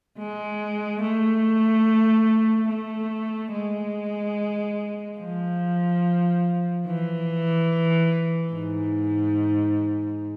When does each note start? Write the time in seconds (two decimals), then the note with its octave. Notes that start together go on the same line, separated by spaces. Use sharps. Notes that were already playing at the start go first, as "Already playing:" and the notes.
0.18 G#3
1.01 A3
2.68 A3
3.52 G#3
5.19 F3
6.86 E3
8.53 G#2